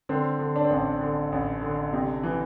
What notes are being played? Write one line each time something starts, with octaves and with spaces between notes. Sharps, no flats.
D3 C4
D3
D4
C4
A1 D4
D3
A1
D3
C3
E3